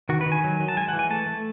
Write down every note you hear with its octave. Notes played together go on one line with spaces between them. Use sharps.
D#3 F#4
B4
D#3
G#5
F#3
F#3
A5
G#3 G#5
F#5
E3
G#5
A3 A5
A3